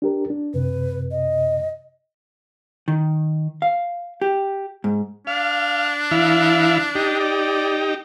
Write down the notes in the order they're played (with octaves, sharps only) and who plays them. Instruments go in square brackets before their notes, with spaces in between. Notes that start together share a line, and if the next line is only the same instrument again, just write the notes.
[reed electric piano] D4 G4 A#4
D4
[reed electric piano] F#2 C3 [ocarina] B4
[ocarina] D#5
[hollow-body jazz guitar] D#3
F5
G4
G#2
[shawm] D4 [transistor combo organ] F5
[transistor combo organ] E3 E4 F5
D#4 G4
[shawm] D5